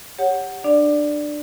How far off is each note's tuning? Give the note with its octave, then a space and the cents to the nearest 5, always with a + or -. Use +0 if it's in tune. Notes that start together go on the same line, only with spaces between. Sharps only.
G4 +15 C#5 +0 F#5 +5
D4 +20 D5 +0